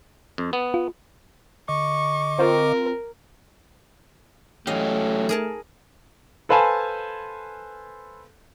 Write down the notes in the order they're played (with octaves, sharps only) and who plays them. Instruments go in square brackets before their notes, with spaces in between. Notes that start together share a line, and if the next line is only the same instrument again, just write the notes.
[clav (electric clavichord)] F2
B3
[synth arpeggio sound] F4
[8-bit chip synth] D3 D#5 D6 [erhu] C#6
[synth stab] C4 F4 [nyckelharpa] A#4
[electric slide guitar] E3 F#3 G4 [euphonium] A3 [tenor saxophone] C#4 [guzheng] D#5 F5
[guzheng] G#4 A#4 A5
[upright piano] A4 B4 C5 F5 G#5 A5